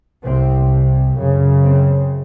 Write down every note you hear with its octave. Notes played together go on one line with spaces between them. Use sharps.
C2 C3 C4
F#2 C#3
C4